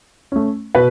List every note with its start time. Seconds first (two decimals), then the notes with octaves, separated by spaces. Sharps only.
0.32 A3 C#4
0.75 B2 B4